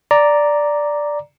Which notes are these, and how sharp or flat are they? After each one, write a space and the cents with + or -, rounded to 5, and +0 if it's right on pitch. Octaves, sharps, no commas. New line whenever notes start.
D5 +0 A#5 +0